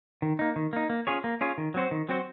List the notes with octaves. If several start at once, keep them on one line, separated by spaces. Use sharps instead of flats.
D#3
A#3 D#4
D#3
A#3 D#4
A#3
C#4 F4 G#4 C#5
A#3
C#4 F4 G#4 C#5
D#3
F#3 C4 F#4 C5
D#3
F#3 C4 F#4 C5